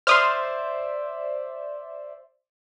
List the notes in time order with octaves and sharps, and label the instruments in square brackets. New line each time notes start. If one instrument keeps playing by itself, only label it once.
[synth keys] C5 D5 E5 [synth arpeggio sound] C6 D#6 F6